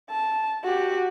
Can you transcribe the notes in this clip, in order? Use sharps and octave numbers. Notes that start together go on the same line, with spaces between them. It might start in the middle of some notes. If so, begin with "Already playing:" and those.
A5
F#4 G4